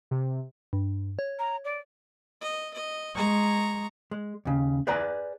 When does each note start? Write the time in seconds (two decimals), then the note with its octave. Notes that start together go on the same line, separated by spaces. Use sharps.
0.11 C3
0.73 G2
1.19 C#5
1.39 A#5
1.65 D5
2.41 D#5
2.74 D#5
3.15 G#3 A#5 C#6
4.11 G#3
4.45 D#2 C#3
4.87 G#4 B4 D5 G#5 A#5